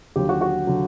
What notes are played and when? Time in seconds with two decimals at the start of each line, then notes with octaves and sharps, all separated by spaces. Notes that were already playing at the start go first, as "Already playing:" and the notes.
0.16 D#2 D3 F#3 G4
0.29 F#4
0.41 F#4
0.67 D3 F#3